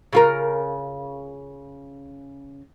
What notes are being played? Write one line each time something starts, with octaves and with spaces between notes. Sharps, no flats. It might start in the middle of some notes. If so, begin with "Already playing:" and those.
C#3 F4 A#4